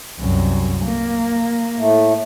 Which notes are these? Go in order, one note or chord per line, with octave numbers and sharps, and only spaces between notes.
C2 F#2
A#3
A2 A3